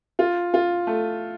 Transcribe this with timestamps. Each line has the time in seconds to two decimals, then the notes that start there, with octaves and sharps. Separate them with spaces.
0.19 F4
0.54 F4
0.87 A3